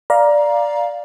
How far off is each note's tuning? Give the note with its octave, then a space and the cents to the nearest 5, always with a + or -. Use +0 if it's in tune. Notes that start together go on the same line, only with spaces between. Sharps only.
D5 +0 F5 +0 A#5 +20